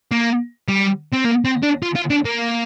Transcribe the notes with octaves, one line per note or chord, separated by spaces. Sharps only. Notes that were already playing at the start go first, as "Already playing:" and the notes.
A#3
G3
C4
A#3
C4
D4
F4
F4
D4
A#3